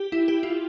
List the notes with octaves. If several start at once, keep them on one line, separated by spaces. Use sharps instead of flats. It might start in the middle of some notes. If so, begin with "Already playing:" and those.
Already playing: G4
E4
G4
F4